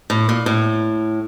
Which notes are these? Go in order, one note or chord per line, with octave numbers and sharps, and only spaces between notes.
A2
A#2
A2